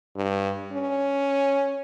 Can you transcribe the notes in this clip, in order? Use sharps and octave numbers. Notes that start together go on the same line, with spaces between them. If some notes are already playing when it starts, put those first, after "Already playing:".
G2
C#4